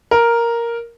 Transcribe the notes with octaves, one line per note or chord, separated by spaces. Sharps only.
A#4